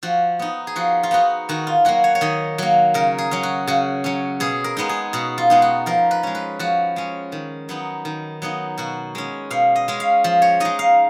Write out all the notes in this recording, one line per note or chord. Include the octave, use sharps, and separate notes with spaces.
F3 F#4
B3 D#4
G#4
F3 F#4
F4
B3 D#4 F#4
D#3 F#4
F4
F#3 A#3 F#4
C#5
C#5
D#3 D#5
F#3 A#3
C#3 A#4
G#4
F#3 C#4
F#4
C#3 F#4
F#3 C#4
B2 G#4
A#4
G#3 B3 D#4
G#4
B2 F#4
F4
G#3 B3 D#4
F#4
F3 A#4
B4
G#3 C#4
B4
F3 F#4
G#3 C#4
D#3
F#3 B3 D#4
D#3
F#3 B3 D#4
B2 F#4
G#3 C#4
B2 F5
D#5
G#3 C#4
F5
F3
C#5
G#3 D#4 D#5
F5